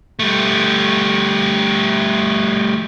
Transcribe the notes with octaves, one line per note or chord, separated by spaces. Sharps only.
G3 A3